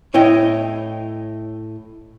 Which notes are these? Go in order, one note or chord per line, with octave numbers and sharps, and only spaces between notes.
A2 E4 C#5 D#5 G5